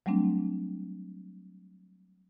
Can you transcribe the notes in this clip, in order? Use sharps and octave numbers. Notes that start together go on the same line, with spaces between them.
F#3 G3 A3 C4 D4